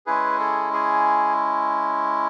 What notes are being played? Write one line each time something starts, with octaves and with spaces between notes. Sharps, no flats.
G#3 C#4 E4 G#4 B4
A4
G#4